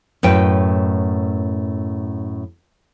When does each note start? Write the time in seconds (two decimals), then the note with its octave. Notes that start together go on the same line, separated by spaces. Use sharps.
0.23 F#2 A2 B4 G5